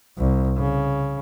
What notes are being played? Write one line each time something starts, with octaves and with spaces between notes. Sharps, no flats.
C2
C#3